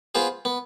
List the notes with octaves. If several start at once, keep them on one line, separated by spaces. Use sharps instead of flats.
B3 F4 G#4 C5
B3